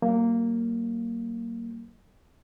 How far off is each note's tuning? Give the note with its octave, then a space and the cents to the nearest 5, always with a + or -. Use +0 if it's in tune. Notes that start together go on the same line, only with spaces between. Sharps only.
F#3 +40 A#3 -10